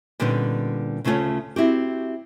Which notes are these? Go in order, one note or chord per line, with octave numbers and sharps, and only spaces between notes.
A#2 D3 G3 B3 C#4 D#4
D2 C#3 A3 F4 C#5 A5
C4 E4 F#4 G4